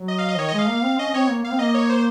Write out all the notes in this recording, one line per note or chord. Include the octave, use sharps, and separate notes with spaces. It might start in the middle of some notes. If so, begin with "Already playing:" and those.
Already playing: F#3
D#5
F5
D#5
D#3 C#5
D#5
G#3
F5
A#3
C4
C#4 D#5
C#4
C4 C#5
A#3
A#3 F5
C4
A#3 D#5
C#5
C5